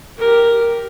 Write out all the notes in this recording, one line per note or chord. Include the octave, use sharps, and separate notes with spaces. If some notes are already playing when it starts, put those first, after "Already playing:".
G4 A#4